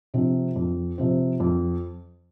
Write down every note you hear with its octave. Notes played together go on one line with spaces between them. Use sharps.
C3 F3 C4
F2
C3 F3 C4
F2